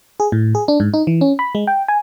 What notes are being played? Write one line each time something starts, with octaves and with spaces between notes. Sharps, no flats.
G#4
A2
G#4
D4
G#2
D#4
E3
C#4
B5
G#3
G5
G#5